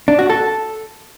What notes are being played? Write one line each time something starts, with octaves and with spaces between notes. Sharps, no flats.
D4
F#4
A4